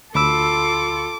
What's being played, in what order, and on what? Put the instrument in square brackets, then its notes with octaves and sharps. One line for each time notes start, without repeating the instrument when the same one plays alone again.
[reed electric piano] D2 B5 E6 [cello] F4 A4 [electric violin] D6